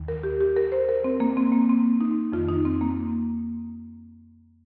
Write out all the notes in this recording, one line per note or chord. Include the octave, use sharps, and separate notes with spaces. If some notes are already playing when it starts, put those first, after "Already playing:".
Already playing: D#2 D#3
A#4
G4
G4
A#4
C5
A#4
C4
A#3
C4
A#3
C4
D#4
F2 D#3 F4
D#4
C4
A#3